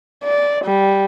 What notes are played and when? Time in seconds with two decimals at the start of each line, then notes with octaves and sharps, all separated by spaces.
0.24 D5
0.65 G3